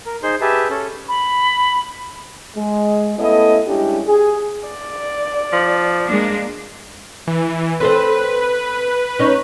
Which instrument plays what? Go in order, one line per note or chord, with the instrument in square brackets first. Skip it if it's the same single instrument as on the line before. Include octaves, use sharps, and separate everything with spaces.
[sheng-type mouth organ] A#4
D#4 G#4 C5 C6
G4 G#4 B4 E5 A5
C#4 A4
[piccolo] B5
[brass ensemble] G#3
A3 B3 C#4 E4 A4 D#5
G3 G#3 C#4 D4 E4 G4
G#4
[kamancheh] D5
[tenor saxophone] F3
[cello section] G#3 A#3 D4
[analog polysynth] E3
[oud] C4 A4 C5 [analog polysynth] B4
[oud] C#4 D#4